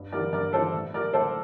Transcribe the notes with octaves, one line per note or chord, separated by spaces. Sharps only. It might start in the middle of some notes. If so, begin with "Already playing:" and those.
Already playing: G2
E3 G3 A#4 D5
G2 A#4 D5
E3 G3 A4 C5
A2
G3 A#4 D5
A2 A4 C5